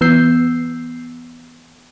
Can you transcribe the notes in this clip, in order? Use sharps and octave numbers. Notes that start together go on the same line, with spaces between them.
E3 B3 E6 G6 C7